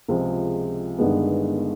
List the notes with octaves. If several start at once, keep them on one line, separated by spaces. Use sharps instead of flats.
C#2 C3 F3 G#3
G1 G2 D#3 G#3 B3